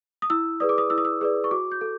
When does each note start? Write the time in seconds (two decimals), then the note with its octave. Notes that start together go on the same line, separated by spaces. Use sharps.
0.22 D#6
0.30 E4 E6
0.60 G#4 B4 D5 D#6
0.69 D6
0.78 D#6
0.90 E4 E6
0.98 D#6
1.05 E6
1.21 G#4 B4 D5
1.44 C#6
1.51 F#4 D6
1.72 G6
1.81 A4